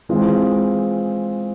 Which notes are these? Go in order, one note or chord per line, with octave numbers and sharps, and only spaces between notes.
E3 G#3 C4 F4